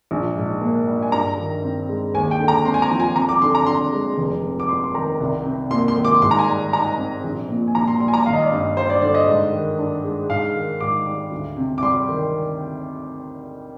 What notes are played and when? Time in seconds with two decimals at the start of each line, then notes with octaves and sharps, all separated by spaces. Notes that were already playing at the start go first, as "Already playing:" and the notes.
0.11 A#1
0.36 G#2
0.62 A#3
0.87 G3
1.03 G#5
1.12 G2 A#5
1.38 D#3
1.63 C4
1.89 G#3
2.14 D#2 G#5
2.31 G5
2.40 D3
2.48 A#5
2.65 C4 C6
2.74 G#5
2.82 A#5
2.91 F3
3.00 G#5
3.16 F2 A#5
3.29 D6
3.42 D3 C6
3.55 A#5
3.67 D4 C6
3.93 G#3
4.18 F1
4.44 F2
4.60 D6
4.69 G3 C6
4.84 C6
4.94 D#3 A#5
5.20 C2
5.45 C3
5.71 A#3 C6
5.88 C6
5.96 D#3
6.05 D6
6.22 G#2 C6
6.31 A#5
6.39 G#5
6.47 G3
6.73 D#4 A#5
6.98 C4
7.24 A#1
7.49 A#2
7.68 G#5
7.75 A#1 A#5
7.88 C6
8.00 G3 C6
8.08 G#5
8.14 A#5
8.26 G#1 F5
8.33 D#5
8.42 D5
8.50 G2 D#5
8.77 G3 C5
8.90 D5
9.02 D3 D5
9.15 D#5
9.28 G#2
9.53 D#3
9.79 D4
10.04 G#3
10.30 G#2 F5
10.55 D#3
10.80 G#2 D6
11.06 G3
11.31 D2
11.57 C3
11.78 D6
11.82 G3 C6
12.09 D#3